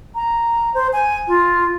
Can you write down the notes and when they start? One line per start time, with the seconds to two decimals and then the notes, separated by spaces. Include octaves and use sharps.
0.15 A#5
0.74 C5
0.93 G#5
1.28 F4